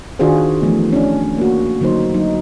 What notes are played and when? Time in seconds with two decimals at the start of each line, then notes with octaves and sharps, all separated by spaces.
0.19 D#3 D4 F4 F#4 G#4 C5
0.62 E3 F3 A3 B3
0.93 C#4 D4
1.38 A#3 F#4
1.81 D3 F#3 A#3 D#4 C5
2.14 F#3 D#4